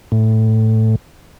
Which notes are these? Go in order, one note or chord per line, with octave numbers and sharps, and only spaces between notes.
A2